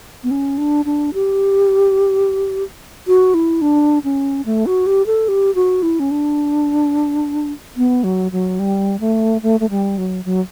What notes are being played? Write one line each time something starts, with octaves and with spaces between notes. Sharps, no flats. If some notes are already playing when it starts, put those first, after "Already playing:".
B3
C#4
D4
D4
G4
F#4
E4
D4
C#4
A3
F#4
G4
A4
G4
F#4
E4
C#4
D4
B3
F#3
F#3
G3
A3
A3
A3
G3
F#3
F#3